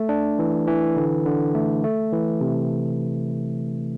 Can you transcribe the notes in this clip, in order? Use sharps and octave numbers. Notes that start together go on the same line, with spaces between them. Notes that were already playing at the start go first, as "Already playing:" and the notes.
Already playing: A3
D4
E3
E3
D3
D3
A3
A3
E3
C3